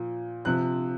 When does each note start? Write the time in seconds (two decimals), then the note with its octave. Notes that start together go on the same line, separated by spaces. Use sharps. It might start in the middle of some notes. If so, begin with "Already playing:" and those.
Already playing: A#2 F3
0.45 C3 F3 F#6